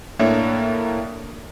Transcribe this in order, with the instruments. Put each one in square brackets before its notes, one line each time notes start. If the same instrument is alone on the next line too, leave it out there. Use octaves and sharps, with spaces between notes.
[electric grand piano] A2 A#3 D4 A#4 C#5 E5